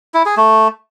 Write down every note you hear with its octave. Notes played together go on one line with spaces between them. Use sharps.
E4
G#4
A3